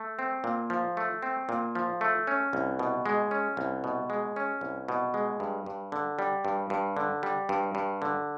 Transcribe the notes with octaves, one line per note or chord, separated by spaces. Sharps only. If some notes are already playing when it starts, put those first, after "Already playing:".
Already playing: A3
C4
A#2
F3
A3
C4
A#2
F3
A3
C#4
C2
B2
G#3
C#4
C2
B2
G#3
C#4
C2
B2
G#3
G2
G2
D3
G3
G2
G2
D3
G3
G2
G2
D3